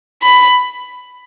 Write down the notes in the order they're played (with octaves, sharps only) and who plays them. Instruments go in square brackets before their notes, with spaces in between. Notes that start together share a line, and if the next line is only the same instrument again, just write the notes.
[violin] B5